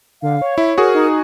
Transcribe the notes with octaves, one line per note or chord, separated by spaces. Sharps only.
D3 F5
C#5
E4 E5
F#4 G#4 A#4
D#4